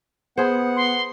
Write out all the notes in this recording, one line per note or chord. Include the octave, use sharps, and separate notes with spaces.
B3 G#4 C5 F#5
C6